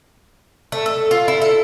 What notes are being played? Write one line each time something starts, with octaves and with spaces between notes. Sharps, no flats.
A3
A4
F4
E4
A4